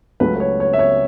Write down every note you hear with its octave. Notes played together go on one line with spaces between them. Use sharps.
C#2 C#3 F#3 A3 B4
B4
C#5
C#5
E5
C#5